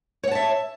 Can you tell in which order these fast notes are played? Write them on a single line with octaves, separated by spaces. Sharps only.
C#5 F#5 A5 E5